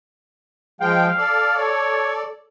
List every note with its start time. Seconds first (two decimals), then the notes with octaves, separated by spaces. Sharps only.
0.81 F3 G#3 F5 G5
1.18 A4 D5
1.56 C#5